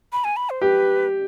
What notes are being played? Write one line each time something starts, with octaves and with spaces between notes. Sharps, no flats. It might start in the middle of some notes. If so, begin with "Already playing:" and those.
B5
G#5
B5
C5
G4 B4